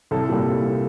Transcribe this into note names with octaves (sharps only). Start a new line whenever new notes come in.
C2 A4
A#2 G3